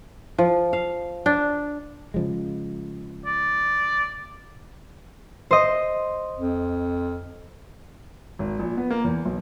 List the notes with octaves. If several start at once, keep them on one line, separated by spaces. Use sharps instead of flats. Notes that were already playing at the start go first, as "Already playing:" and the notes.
F3
F5
D4
C#3 F3 G#3
D5
C5 D#5
F2
G#1
A#1
B3
A#3
E2
B1